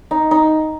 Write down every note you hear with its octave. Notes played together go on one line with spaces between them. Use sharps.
D#4
D#4